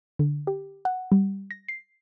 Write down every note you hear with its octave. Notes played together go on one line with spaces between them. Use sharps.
D3
G4
F#5
G3
A#6
C7